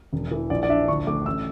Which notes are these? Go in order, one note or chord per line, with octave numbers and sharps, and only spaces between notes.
E1
E3
A#1 D5
D5
D4 E5
D2 C#6
A3 D6
A1 E6